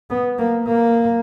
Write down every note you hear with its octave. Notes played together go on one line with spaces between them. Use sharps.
B3
A#3
A#3